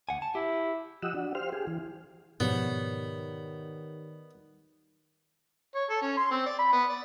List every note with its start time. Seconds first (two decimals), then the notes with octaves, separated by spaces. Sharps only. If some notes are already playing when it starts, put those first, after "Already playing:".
0.09 D2 F#5 G#5
0.22 A5
0.35 E4 G4
1.02 F3 G4 D#5 F#5 E6
1.14 D4 F#4
1.35 G4 C5 F5 F6
1.52 G4 G#4
1.67 E3
2.40 G#2 B2 D#3 F3 B3 G4 C#5 D5
5.75 C#5
5.90 A4
6.02 C#4
6.17 C6
6.31 C4
6.46 D5
6.59 B5
6.73 B3
6.89 D5